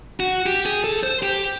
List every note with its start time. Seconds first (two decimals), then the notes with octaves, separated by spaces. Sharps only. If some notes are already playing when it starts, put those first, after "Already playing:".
0.20 F#4
0.46 G4
0.66 G#4
0.84 A4
1.03 C5
1.23 G4